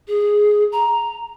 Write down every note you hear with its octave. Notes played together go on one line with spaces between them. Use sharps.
G#4
A#5